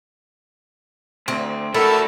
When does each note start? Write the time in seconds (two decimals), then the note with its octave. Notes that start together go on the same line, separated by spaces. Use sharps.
1.28 D2 C4
1.74 A3 E4 F#4 A4 A#4 E5 A5